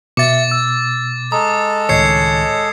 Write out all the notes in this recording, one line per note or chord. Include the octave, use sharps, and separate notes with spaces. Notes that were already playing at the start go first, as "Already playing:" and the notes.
B2 E5 D6 A6 C#7
E6
G#3 A4 A#5 D#6
C#2 A2 D#3 C#5 D#5 G#6 C7 C#7